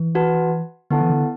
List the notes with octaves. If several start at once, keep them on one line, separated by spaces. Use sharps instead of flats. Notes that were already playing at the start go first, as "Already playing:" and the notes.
Already playing: E3
F#4 B4 F#5 A5
D3 B3 E4 A4 F#5 A5
E3
D3